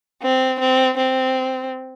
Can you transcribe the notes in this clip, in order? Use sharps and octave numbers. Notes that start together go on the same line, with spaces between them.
C4
C4
C4